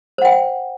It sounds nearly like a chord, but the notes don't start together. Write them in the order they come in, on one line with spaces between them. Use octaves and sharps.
C5 F#5 G5